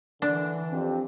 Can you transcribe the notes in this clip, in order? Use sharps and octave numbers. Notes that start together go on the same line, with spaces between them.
D3 E3 D4
F2 C4 G4